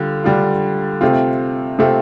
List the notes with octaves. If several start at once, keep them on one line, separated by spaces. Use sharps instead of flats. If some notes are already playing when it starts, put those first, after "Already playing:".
Already playing: D3 G3 F4
D3 G3 D4 F4
C3 A3 C4 F4
C3 A3 C4 F4